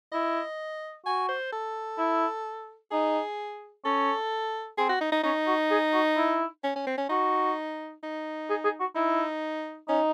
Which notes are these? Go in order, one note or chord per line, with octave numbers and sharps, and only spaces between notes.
E4 D#5
F#4 G#5
C5
A4
E4
D#4 G#4
C#4 A4
C4 G#4
F#4
D#4
D#4
C#4 D#4
F#4
G#4
F#4
E4
C#4
C#4
C4
C#4
D#4 F#4
D#4
G#4
G#4
F#4
D#4 E4
C#4 D#4